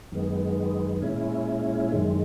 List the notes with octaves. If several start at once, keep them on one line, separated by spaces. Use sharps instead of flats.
F#2 D#3 G#3 B3
A#2 G#3 C#4 E4
F#2 D#3 G#3